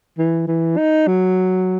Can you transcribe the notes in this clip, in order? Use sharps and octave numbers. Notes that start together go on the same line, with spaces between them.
E3
E3
D#4
F#3